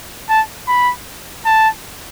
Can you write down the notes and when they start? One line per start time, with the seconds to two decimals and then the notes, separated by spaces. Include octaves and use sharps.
0.29 A5
0.68 B5
1.45 A5